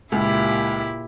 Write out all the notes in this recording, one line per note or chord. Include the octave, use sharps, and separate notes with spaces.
C#2 A#2 E4 G4